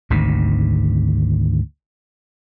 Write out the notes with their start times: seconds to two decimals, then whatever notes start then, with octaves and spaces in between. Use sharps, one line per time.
0.10 G#1 D2 C3 D#3